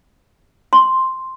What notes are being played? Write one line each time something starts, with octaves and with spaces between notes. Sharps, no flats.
C6